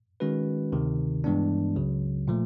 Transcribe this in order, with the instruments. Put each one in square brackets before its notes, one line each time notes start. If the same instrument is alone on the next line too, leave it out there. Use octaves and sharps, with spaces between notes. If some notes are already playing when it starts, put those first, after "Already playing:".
[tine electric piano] D#3 G#3 C#4 F#4 B4
D2 C3 D#3
G2 E3 G#3 B3 D4
C#2 C#3 F#3
A#2 F3 A3